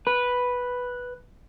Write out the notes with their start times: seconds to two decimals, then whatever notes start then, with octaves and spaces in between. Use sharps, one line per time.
0.07 B4